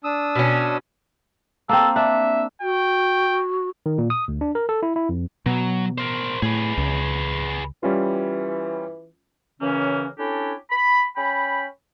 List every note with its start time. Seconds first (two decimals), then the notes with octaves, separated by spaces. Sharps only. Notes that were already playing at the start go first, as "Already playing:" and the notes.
0.04 D4 D#6 E6
0.35 B2 C#4
1.69 A#3 C4 A4
1.96 D4 E5
2.62 F#4 G5
3.86 D#3
3.98 A#2
4.10 D#6
4.28 D2
4.41 D4
4.55 A#4
4.69 A4
4.83 E4
4.96 E4
5.09 F2
5.46 B2 F#3
5.98 A#4 C5
6.42 A2 G#4 B4
6.77 C#2
7.83 E3 G3 C#4 F4
9.60 F#2 C#3 E3 A#3 C#4
10.18 C#4 D4 E4 G4 A4
10.71 B5
11.16 C#4 G5 B5